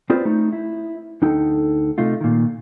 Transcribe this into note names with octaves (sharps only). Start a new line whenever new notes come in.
C4 F4 G#4 B4 C5 D5
A3 D#4
E4
D2 D3 D#4 A4 G5
C3 A3 D#4 F4
A#2 D#3